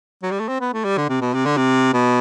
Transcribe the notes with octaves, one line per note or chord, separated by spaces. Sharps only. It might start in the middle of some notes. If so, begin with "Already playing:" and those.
F#3
G3
A3
C4
B3
A3
G3
D3
C3
B2
C3
D3
C3
B2